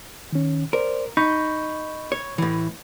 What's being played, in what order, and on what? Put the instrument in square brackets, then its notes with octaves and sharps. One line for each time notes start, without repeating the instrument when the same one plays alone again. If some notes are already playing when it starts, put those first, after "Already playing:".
[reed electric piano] D#3 C#4
[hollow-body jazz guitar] A#4 [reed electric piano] C5 D5
[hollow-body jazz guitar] D#4 [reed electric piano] B5 C#6 G6
[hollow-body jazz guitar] C#5
A2 E3